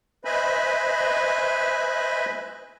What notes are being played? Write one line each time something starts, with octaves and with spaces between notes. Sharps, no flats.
B4 C5 D#5 E5 G#5 B5